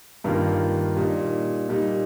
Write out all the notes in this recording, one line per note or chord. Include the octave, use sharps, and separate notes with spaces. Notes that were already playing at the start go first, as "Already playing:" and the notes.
G2 D#3 A#3 F4
A#2 G3 D#4
A#2 G3 D#4